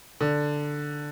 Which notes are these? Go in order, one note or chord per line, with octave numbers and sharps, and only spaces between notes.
D3